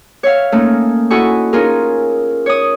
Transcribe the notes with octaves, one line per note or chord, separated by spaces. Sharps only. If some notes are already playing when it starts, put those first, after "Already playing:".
C#5 E5 F5
A3 A#3 C#4 D#4
E4 F#4 A4 D#5 G#5 C#6
C#4 D#4 F4 G#4 A#4
C#5 D#6